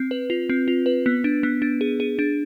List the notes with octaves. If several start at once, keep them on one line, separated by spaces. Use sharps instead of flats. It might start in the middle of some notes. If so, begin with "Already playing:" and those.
Already playing: C4
B4
F4
C4
F4
B4
B3
D4
B3
D4
G#4
G#4
D4